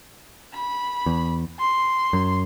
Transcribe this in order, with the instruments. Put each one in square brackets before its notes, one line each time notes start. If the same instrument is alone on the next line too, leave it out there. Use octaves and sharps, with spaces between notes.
[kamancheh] B5
[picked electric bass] E2
[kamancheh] C6
[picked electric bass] F#2